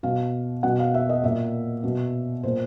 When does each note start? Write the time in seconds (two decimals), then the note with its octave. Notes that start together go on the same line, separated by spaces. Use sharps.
0.03 B2 F5
0.63 B2 F#5
0.79 F5
0.94 E5
1.09 D#5
1.24 A#2 E5
1.84 B2
2.43 A#2 C5